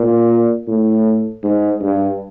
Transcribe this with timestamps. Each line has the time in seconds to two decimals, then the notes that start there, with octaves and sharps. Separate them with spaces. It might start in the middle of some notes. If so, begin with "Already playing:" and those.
Already playing: A#2
0.68 A2
1.43 G#2
1.81 G2